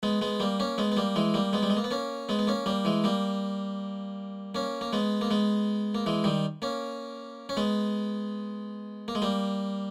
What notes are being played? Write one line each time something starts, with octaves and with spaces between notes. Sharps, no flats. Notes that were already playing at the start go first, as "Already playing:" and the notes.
G#3 B3
G#3 B3
G3 A#3
A#3 C#4
G#3 B3
B3
G3 A#3
E3 G#3
G3 A#3
G#3 B3
G3
G#3
A#3
B3
A#3 C#4
G#3 B3
B3
A#3 C#4
G3 A#3
E3 G#3
G3 A#3
A#3 C#4
A#3
G#3 B3
A#3
G#3 B3
A#3
E3 G#3
D#3 G3
A#3 C#4
C#4
G#3 B3
A#3
G#3
G3 A#3